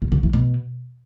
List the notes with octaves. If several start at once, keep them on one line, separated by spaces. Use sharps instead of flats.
B2
C#3
E3
B2